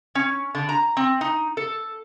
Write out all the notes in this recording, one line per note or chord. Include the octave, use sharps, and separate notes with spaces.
C#4
D3
A#5
C4
D#4
A4